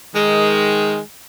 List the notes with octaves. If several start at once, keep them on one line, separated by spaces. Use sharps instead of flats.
D#3 G#3